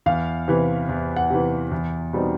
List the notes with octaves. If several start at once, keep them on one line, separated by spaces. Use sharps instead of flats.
E2 F5
C3 E3
E2
F#5
C3 E3
E2
B2 G3 C4 D#4